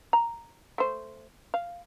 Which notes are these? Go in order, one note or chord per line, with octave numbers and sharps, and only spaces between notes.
A#5
A3 C5
F5